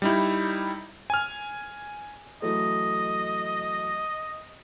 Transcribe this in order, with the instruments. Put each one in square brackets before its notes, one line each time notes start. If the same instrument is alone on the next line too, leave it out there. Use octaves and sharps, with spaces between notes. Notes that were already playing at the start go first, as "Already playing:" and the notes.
[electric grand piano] G3 D#4 E4
G#5 F6
[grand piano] E3 F#3 A3 [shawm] D#5